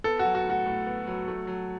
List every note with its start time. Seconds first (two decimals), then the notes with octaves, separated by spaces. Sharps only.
0.04 B3 A4
0.19 F#3 F#4
0.35 F#4
0.45 A2
0.50 F#4
0.66 A2
0.86 B3
1.07 F#3
1.28 A3
1.47 F#3